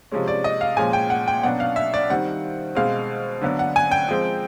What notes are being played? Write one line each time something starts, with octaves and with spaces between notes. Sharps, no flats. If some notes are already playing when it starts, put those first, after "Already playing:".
C3 F3 G#3 C#4
D5
D#5
F5
A#2 F3 G#3 C#4 G#5
G5
F#5
G5
B2 F#3 B3 D4 F#5
F5
E5
D5
D#3 G3 C4 F#5
B2 G#3 C4 F5
D3 F#3 B3 D4
F#5
G#5
G5
F3 G#3 C4